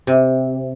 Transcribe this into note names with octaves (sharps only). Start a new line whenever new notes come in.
C3